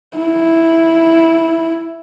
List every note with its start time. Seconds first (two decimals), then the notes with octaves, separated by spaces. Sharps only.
0.17 E4